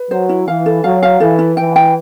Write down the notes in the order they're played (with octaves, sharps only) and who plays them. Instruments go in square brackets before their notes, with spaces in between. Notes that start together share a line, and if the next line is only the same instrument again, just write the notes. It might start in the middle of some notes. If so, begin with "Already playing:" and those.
Already playing: [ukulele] B4
[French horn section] F#3 [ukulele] C5
[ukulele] E4
[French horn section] E3 [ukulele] F5
[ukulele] A4
[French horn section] F#3 [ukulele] F5
[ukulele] F5
[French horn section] E3 [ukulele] A4
[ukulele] E4
[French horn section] E3 [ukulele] G5
[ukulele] G5